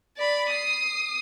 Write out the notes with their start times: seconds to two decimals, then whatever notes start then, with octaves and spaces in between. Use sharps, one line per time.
0.17 D5 B5
0.51 D#6 C7